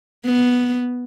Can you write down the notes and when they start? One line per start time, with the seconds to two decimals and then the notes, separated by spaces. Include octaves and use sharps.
0.25 B3